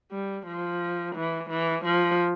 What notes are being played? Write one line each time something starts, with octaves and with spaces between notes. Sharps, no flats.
G3
F3
E3
E3
F3